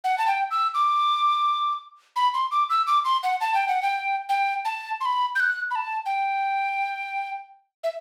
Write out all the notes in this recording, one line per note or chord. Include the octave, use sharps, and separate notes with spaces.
F#5
A5
G5
E6
D6
B5
C6
D6
E6
D6
C6
F#5
A5
G5
F#5
G5
G5
A5
C6
B5
G6
F#6
B5
A5
G5
E5